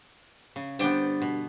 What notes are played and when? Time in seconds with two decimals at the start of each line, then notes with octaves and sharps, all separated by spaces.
0.56 C#3
0.79 G2 D3 B3 C5 D5 G5
1.22 B2